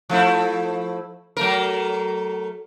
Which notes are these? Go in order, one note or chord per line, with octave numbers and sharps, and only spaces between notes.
F3 A3 E4
F#3 A3 A#4